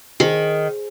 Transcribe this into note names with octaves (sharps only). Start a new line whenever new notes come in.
D#3 G#4 C5